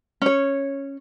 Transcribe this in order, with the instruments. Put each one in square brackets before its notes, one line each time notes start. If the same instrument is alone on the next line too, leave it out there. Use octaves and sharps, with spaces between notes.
[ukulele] C#4 C#5